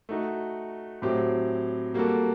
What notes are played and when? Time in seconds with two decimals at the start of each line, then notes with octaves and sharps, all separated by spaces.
0.09 A3 D#4 F#4
1.02 A2 F#3 C4 G4
1.94 G3 A#3 F#4 A4